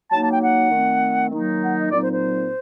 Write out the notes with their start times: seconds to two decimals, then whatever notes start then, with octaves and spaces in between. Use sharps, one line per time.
0.10 F#3 A#3 D#4 A5
0.21 A5
0.31 G5
0.42 F#5
0.71 D#3 A3 C4
1.31 D#3 F#3 A#3 D#4
1.61 F#5
1.77 D#5
1.91 A#2 F#3 C4 D#4 D5
2.01 C5
2.12 C5